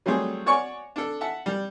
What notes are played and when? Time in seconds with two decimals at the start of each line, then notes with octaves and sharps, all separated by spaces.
0.06 F#3 G3 A3 C4 G#4
0.46 F#4 C#5 D5 G#5 C#6
0.96 D4 A4
1.21 E5 F#5 A5
1.46 G3